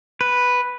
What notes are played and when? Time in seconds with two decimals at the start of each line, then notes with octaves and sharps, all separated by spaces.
0.21 B4